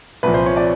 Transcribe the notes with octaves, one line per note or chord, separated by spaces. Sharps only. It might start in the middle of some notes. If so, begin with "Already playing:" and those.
C2 A#2 F3 B4
C5
C#5
D5